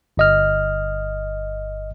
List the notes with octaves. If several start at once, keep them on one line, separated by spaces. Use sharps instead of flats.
G1 D#5 F6